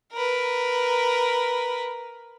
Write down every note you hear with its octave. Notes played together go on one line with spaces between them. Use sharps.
A#4 B4